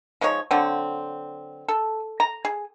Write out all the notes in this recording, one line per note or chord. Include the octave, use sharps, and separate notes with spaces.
F3 G#3 D#4 C#5
D3 F#3 C4
A4
A#5
G#4